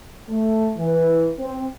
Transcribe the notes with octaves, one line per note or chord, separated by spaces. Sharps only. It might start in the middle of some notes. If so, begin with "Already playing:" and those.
A3
E3
C4